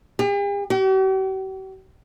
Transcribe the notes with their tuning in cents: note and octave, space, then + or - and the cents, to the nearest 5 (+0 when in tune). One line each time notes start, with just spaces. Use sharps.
G4 +45
G4 -45